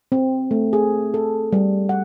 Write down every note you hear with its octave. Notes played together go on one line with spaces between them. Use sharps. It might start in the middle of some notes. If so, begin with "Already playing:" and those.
C4
A3
G#4
A4
G3
F#5